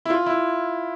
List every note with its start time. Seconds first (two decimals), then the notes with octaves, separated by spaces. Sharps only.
0.05 E4
0.10 F4
0.26 E4